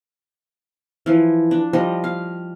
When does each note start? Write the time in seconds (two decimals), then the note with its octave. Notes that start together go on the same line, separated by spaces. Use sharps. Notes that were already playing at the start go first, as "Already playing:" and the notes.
1.06 E3 F3
1.51 D4
1.73 F3 G3 D#5
2.04 F5